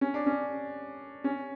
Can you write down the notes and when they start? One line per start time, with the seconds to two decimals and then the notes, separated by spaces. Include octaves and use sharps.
0.01 C#4
0.14 D4
0.26 C#4
1.24 C#4